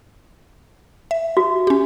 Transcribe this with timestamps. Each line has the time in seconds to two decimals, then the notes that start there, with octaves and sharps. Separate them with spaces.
1.11 E5
1.37 F#4
1.67 C#4 G4